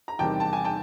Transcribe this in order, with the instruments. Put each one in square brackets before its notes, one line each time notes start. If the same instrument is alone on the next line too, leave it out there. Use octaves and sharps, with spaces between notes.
[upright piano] A#5
E2 C3 D#3 G3 G5 A5
A5
G#5
G5 A5